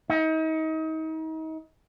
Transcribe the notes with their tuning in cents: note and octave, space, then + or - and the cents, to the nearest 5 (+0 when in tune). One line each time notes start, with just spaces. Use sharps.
D#4 +35